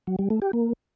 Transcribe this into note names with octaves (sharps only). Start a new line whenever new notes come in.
F#3
G3
A3
G4
A#3